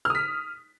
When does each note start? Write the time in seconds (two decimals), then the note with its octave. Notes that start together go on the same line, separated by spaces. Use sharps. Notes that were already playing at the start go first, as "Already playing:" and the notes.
0.05 F6
0.10 D#6
0.15 B6